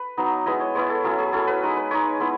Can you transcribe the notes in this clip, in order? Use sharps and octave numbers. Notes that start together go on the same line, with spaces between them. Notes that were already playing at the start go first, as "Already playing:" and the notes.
Already playing: B4
F#3 B3 D#4
G#3 B3 E4 D#5
C#5
G#3 B3 E4 C#5
A4
F#3 C#4 E4 G#4
G#4
F#3 C#4 E4 A4
B4
G#3 D#4
B4
G#3 D#4 C#5
G#3 B3 E4